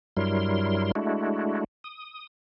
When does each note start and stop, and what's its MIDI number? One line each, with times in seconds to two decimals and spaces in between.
0.17 0.92 43
0.17 0.92 54
0.17 0.92 55
0.17 0.92 64
0.17 0.92 70
0.17 0.92 84
0.95 1.64 56
0.95 1.64 57
0.95 1.64 62
0.95 1.64 64
0.95 1.64 66
1.84 2.27 87